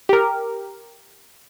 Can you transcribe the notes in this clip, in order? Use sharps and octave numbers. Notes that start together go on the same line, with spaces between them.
G4 A#4